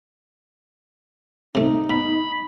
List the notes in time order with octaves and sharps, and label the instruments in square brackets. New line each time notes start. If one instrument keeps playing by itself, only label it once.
[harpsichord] C3 A3 [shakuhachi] D#4
[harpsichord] B2 [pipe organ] B5